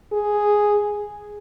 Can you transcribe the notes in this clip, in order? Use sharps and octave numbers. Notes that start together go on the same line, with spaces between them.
G#4